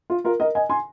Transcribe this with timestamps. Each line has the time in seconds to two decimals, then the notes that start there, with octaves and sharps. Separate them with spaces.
0.10 F4
0.25 F4 A#4
0.40 A#4 D#5
0.55 D#5 G#5
0.70 G#5 C6